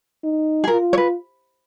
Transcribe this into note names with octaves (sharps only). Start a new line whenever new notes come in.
D#4
G#4
F4 A#4
C#5
B4